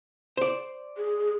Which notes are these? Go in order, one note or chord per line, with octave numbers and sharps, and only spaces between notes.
C5 D5
G#4